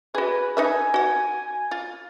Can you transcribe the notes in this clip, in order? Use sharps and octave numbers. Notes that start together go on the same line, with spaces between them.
F#4 G#4 B4
D#4 B4 E5 G#5
F#4 F#5
F4